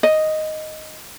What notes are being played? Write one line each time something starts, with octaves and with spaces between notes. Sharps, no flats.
D#5